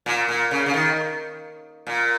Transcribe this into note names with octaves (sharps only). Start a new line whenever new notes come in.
A#2
A#2
C#3
C#3
D#3
A#2